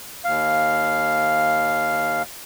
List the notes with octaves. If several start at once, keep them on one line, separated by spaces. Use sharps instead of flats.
D#2 F5